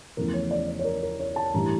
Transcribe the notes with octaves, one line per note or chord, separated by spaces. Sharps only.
E2 C#3 F3 A3 A#4
C#5
D5
D5
C#5
A#4
A#4
C#5
A5
A1 G2 E3 G3 A#5